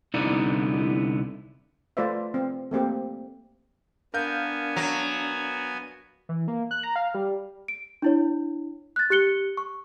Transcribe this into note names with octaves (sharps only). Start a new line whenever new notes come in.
C2 D3 B3 D#4 E4 D5
A3 F4 B4 C5 D5 E5
C4
A3 A#3 C4 G4
B3 D4 A#4 F5 G#5 G6
F#3
E3
A#3
F#6
A#5
F5
G3
D7
D4 E4 C#5
F#6 A6
G4 F#6 C#7 G7
C#6